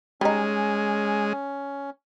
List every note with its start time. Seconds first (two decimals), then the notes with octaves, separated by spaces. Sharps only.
0.21 G3 G#3 C#4 D#4